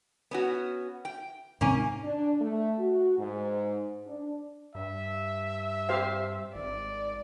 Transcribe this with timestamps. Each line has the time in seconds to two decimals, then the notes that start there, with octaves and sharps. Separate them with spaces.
0.31 B3 C#4 F#4
1.05 G5
1.61 G#2 C3 D#3 A#3 C#4 G#5
2.03 D4
2.40 A3
2.78 F#4
3.17 G#2
4.06 D4
4.75 G2 E5
5.89 G4 C5 F5
6.55 G#1 D5